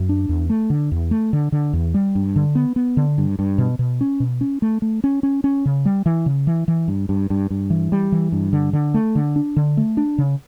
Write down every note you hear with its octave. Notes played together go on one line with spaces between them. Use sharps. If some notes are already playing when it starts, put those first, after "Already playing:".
Already playing: F#2
D4
E2
A3
D3
E2
A3
D3
D3
E2
G3
G2
D3
B3
B3
D3
G2
G2
B2
B2
C#4
B2
C#4
A3
A3
C#4
C#4
C#4
C#3
G3
E3
C#3
E3
E3
G2
G2
G2
G2
E3
G3
E3
G2
D3
D3
A3
D3
D4
D3
A3
D4
C#3